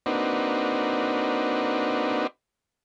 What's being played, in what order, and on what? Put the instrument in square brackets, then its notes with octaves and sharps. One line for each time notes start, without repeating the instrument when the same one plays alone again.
[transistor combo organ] A#3 C4 D4 D#4 F#4 B4